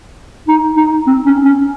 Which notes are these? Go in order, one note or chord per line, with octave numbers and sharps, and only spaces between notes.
D#4
D#4
C4
C#4
C#4